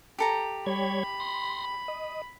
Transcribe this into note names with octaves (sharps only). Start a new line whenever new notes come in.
G4 A4 A#5
G3 C#5 B5 G#6
C6 A#6
D#5